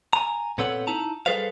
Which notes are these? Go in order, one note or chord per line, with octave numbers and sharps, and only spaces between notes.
G#5 A#5
A#2 B3 C4 A4 C#5 F#5
D#4 E4 A5 A#5
G3 G#4 A4 B4 C5 F5